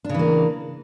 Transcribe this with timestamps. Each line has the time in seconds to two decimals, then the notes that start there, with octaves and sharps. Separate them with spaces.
0.04 D4
0.09 C#3
0.14 E3
0.19 A#3